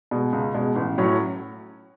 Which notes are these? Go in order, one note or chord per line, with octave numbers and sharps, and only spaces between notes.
B2 G#3
C#2
B2 G#3
A1
A2 F#3 C#4